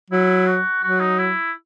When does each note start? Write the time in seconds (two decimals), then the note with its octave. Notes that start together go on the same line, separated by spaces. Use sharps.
0.11 F#3 E4
0.47 F#4
0.83 F#3 F#4
1.00 D#4
1.19 E4